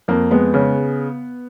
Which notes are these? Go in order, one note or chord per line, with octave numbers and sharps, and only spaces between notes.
F2 A#3
G#3 B3
C#3